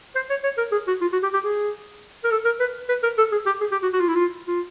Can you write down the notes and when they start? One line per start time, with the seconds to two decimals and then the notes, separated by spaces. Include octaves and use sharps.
0.15 C5
0.30 C#5
0.43 C#5
0.58 A#4
0.72 G#4
0.87 F#4
1.01 F4
1.13 F#4
1.23 G4
1.34 G4
1.44 G#4
2.24 A#4
2.31 A4
2.45 A#4
2.60 B4
2.89 B4
3.03 A#4
3.18 A4
3.32 G#4
3.46 G4
3.60 G#4
3.71 G4
3.82 F#4
3.93 F#4
4.00 F4
4.08 E4
4.15 F4
4.47 F4